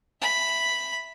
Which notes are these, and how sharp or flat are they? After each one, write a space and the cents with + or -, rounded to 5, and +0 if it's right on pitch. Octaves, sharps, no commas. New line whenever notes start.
E5 +0 B5 +0